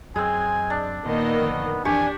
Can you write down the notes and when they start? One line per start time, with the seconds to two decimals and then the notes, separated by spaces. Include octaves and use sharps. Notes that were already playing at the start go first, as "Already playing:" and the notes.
0.16 F#2 G#3 C4 G#5
0.70 D4
1.05 A#2 D#3 A#3 B3 D#5
1.41 A1 F2 D3
1.85 A#1 F2 E3 D4 G4 G#5 C#6